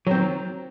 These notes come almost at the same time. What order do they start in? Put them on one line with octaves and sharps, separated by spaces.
F#3 C4 D#3